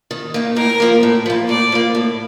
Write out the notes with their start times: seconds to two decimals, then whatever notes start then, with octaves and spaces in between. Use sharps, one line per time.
0.11 D#3
0.34 A#3 D#4
0.56 A2 A#4
0.80 F3 A#3
1.03 A2
1.26 F3 A#3
1.49 A2 D5
1.72 F3 A#3
1.95 A2